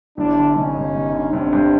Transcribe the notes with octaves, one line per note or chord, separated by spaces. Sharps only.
G1 D4 E4
D3
G1 C#4 D#4
G2
G1
D3
G1 C4 D4
G2